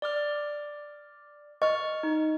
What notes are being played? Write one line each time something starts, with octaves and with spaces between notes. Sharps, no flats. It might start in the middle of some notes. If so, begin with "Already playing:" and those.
D5 D6 F6
D#5 C#6 F6
D#4